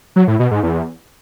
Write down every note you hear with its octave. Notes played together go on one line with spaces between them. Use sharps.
F#3
A2
B2
G#2
E2